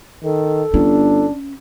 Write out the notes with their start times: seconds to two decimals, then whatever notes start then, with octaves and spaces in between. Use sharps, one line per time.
0.24 D#3 A4
0.74 G1 C#4 D4